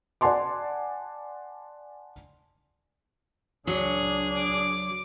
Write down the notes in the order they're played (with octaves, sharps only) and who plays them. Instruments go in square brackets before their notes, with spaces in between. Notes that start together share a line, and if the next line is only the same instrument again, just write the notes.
[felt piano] D5 F#5 G#5 A5 C6 D6
[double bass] C#2 D4 [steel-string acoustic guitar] F#3 [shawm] G#4
[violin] D6